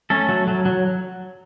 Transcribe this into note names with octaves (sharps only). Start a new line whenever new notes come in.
A3 C#4 A4
F#3
F#3
F#3